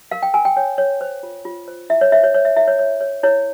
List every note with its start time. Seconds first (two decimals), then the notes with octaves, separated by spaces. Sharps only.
0.11 A#4 F5
0.23 G5
0.34 A#4 G#5
0.45 G5
0.57 C#5 G5
0.78 C#5
1.01 C5
1.23 F4
1.45 F4
1.68 C5
1.90 E4 E5
2.01 C#5
2.12 C5 E5
2.23 C#5
2.34 C5 C#5
2.45 E5
2.56 E4 E5
2.68 C#5
2.79 C#5
3.01 C#5
3.23 E4 C#5